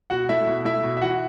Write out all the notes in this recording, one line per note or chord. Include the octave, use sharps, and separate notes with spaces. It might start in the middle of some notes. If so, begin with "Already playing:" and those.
B2 F#4 F#5
A3 E4 E5
B2
A3 E4 E5
B2
E5
E3 F#4 F#5